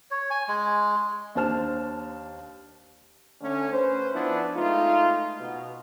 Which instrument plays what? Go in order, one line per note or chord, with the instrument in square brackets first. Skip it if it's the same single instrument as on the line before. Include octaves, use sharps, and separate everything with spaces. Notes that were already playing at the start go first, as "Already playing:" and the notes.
[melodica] C#5
G#5
G#3
[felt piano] D#2 D4 C5 A5 F6 E7
[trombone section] D3 A3 C#4
C#4 B4 C5
F3 B3 D4 E4 B4
G#3 A3 D#4 F4
B2